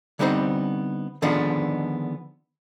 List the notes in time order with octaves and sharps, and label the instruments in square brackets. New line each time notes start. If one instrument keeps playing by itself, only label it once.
[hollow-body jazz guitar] D3 G3 B3 C4 D#4 C5
D3 D#3 F3 G#3 B3 D4